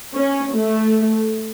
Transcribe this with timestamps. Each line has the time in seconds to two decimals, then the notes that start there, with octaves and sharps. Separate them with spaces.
0.16 C#4
0.55 A3